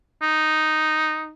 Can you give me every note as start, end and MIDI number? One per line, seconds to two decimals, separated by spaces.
0.22 1.33 63